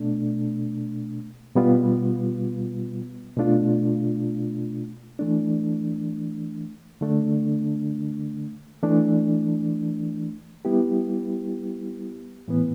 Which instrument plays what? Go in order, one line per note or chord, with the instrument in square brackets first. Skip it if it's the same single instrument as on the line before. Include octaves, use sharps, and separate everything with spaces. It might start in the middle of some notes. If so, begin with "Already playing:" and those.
Already playing: [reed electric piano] B2 A3 D4
B2 G3 B3 F4
B2 A3 D4 F4
E3 A3 D4
D3 A3 D4
E3 A3 D4
G3 B3 E4 G4
A2 E3 B3